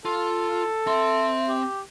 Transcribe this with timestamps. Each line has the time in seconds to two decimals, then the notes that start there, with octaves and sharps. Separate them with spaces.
0.05 F4 A4
0.87 C4 E5 C6
1.48 G4